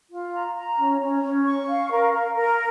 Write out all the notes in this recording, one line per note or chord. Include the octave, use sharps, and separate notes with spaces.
F4
A#5
A#5
C#4
C#4
C#4
C#6
F5
A#4
A#4
A#4